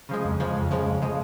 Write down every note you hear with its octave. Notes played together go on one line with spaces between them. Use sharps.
C#3 F3 G#3
F2
C#3 F3 G#3
F2
C#3 F3 G#3
F2
C#3 F3 G#3